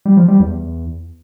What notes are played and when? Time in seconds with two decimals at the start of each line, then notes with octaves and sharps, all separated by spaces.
0.05 G3
0.17 F3
0.28 G3
0.40 E2